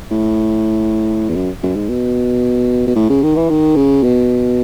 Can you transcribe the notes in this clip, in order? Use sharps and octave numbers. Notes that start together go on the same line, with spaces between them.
A2
E2
F#2
F#2
G#2
B2
B2
A2
C#3
D#3
E3
D#3
C#3
B2